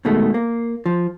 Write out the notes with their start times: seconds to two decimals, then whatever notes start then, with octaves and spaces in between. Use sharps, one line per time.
0.05 B2 D#3 G#3 A3
0.34 A#3
0.86 F3